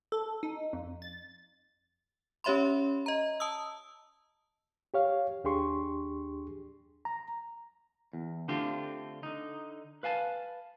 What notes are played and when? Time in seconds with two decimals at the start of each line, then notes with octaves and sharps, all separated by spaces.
0.12 A4
0.43 D#4
0.73 F2
1.02 A6
2.44 C#4 G4 C#5 E5 B5 C6
3.06 D#5 A#5
3.40 A5 D#6 E6
4.94 G4 C#5 F5
5.44 D#2 D4 G4 G#4 C6 C#6
7.05 A#5
8.13 E2
8.48 D3 A3 C4 D4 F4 G4
9.23 D3 D#4
10.03 B4 F5 G#5 A5